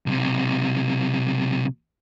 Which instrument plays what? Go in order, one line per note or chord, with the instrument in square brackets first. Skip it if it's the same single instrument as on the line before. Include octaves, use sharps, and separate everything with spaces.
[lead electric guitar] B1 C3